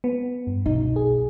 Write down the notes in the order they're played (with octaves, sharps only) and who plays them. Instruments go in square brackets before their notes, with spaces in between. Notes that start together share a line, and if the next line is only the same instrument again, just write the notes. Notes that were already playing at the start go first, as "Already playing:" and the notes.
[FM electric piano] B3
G2
[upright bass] B1 [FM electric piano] D#4
[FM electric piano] G#4